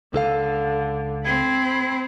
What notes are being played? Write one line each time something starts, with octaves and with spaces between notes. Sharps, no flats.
C#2 D3 A4 F5
C4 B5 G#6